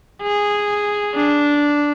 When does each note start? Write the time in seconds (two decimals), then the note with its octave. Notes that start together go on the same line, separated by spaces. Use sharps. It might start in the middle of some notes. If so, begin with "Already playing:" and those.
0.22 G#4
1.16 D4